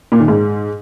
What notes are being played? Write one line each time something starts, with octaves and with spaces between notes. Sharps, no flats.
A#2
D#3
G#2